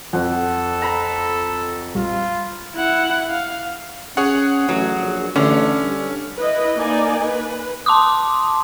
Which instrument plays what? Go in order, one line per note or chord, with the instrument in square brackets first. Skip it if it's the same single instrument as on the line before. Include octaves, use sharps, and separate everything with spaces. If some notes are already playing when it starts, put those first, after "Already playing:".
[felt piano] F2 [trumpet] A4 [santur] F#5
[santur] A#5 B5
[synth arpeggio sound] A#1 G3 [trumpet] F4
[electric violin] E4 F#5
F5
[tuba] C#4 [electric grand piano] G#4 C#5 F#5
[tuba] A1 [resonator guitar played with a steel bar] F#3
[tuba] A#1
[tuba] A1 [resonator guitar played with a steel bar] D3 [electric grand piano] C#4
[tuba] G2
[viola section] E4 B4 D#5
A#3 D#4 D5 G#5
B4
[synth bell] A5 C6 D6 D#6